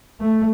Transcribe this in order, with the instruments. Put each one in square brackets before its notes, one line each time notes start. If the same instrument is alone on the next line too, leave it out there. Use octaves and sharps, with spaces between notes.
[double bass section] A3